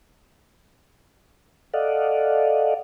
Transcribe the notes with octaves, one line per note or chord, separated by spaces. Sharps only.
A4 D5 D#5 F5 F#5